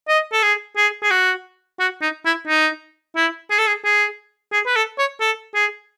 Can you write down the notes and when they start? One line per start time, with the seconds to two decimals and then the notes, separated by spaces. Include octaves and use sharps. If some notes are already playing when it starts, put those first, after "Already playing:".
0.08 D#5
0.33 A4
0.43 G#4
0.77 G#4
1.03 G#4
1.11 F#4
1.80 F#4
2.02 D#4
2.25 E4
2.47 D#4
3.16 E4
3.51 G#4
3.59 A4
3.67 G#4
3.85 G#4
4.53 G#4
4.67 B4
4.76 A4
4.99 C#5
5.21 A4
5.55 G#4